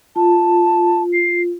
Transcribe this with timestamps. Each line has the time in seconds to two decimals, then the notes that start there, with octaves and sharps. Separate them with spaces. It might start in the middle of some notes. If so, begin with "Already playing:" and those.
0.16 F4 A5
1.13 C7